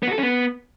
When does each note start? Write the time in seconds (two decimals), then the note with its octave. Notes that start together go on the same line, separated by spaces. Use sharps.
0.03 B3
0.08 F#4
0.13 A4
0.18 C#4
0.23 B3